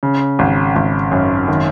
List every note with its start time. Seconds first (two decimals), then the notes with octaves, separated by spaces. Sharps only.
0.03 C#3
0.39 G#1
0.76 G#1
1.11 F#2
1.48 D#3